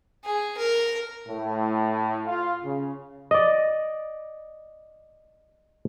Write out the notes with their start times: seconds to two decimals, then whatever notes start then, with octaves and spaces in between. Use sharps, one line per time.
0.25 G#4
0.58 A#4
1.28 A2
2.26 F4
2.64 C#3
3.31 D5 D#5